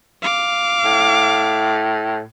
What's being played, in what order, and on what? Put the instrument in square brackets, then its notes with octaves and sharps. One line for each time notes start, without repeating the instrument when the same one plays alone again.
[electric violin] F5 D6
[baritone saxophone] A2